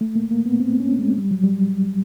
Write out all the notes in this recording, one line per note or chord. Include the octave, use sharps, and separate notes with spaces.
A3
A#3
A#3
B3
C4
C#4
G#3
G3
F#3
G3